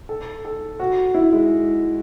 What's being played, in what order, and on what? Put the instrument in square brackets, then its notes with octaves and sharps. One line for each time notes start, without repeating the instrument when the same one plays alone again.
[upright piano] A4
A4
F#4
E4
G#3